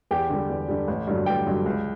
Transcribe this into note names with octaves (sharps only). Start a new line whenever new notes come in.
E2 G4 G5
D3 G3
E2
D3 G3
A1
G2 D3 F#3
A1 G4 G5
G2 D3 F#3
C#2